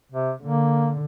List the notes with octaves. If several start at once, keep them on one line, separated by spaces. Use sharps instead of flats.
C3
D3 A#3